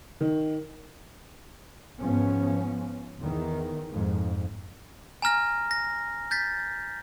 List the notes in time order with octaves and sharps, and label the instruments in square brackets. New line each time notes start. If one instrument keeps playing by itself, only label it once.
[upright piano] D#3
[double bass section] G#2 F3 B3 C#4
E2 D#3
F2 G#2
[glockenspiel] G#5 A#5 F6 A#6
A#6
G6 A6 B6